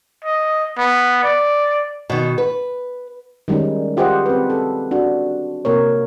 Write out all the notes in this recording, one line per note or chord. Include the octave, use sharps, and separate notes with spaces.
D#5
B3
D5
B2 D#3
B4
D#3 G3 G#3 C#4 D#4
F4 G4 G#4 C5 D#5 F#5
C4 B4
A4
D4 F#4
C3 A#3 A#4 C#5